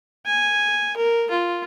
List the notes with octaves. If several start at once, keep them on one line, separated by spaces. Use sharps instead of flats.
G#5
A#4
F4